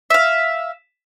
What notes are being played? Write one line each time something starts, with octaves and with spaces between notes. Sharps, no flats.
E5 F5